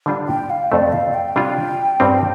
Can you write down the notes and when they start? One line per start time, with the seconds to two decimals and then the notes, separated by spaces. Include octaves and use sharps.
0.06 D3 G3 D4 F4
0.28 G5
0.50 F5
0.71 F2 C3 A3 D5
0.92 F5
1.14 G5
1.36 C3 G3 D4 F4
2.00 G2 G3 C4